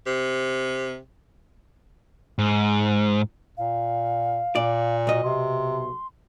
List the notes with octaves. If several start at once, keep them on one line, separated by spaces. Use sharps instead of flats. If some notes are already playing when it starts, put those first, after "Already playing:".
C3
G#2
A#2 F5
A#2 D5
B1 D#5
C3 C6